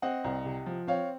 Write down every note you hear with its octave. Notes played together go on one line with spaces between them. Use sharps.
C4 D#5 F#5
C2
C3
F3
C4 C#5 F5